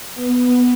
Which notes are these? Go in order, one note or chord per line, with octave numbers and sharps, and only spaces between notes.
B3